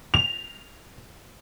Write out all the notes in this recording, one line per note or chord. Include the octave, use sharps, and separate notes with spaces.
F7